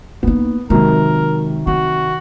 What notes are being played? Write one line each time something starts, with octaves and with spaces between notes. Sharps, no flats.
A#3 B3 D#4
C3 D#3 F#3 G#3 A#4
C4 F#4